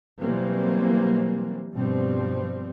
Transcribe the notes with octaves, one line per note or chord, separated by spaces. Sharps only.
B2 E3 F#3 G3 A#3 C4
G2 B2 F3 G3 C4